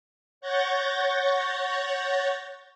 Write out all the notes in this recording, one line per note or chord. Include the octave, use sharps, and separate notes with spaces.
C#5 F#5 C#6 G6 A6 A#6